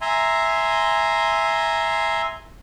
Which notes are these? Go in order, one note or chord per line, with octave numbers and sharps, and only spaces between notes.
E5 G#5 A#5 C6